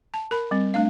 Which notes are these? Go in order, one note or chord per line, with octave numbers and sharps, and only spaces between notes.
A5
A#4 B5
G3 C4
A3 D4 F5